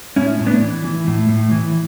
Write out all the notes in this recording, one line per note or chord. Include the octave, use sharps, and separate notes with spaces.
A2 C#4 E4
A2
B3 D4
E3
E3
A2
A2
E3